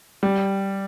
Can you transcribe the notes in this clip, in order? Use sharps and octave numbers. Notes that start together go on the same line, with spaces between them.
G3